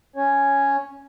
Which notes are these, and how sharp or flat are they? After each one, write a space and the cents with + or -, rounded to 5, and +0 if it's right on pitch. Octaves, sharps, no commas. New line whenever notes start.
C#4 +0 C#5 +0